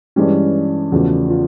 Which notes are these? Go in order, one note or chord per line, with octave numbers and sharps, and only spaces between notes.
G2 E3 G#3 C#4 G4
E2 C#3 F3 A3 C#4 F#4
F4